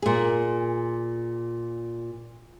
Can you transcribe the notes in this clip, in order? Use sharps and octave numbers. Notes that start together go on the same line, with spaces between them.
A#2 G#4